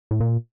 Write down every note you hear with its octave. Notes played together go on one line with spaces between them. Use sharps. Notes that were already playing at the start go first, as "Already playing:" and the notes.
A2
A#2